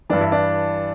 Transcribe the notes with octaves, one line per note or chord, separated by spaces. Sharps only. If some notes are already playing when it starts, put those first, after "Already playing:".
G2 E3 D4
E4
D4